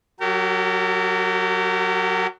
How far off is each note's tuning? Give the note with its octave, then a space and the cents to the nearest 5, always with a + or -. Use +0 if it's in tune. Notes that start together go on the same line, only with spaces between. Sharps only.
F#3 +0 G4 -40 A#4 -35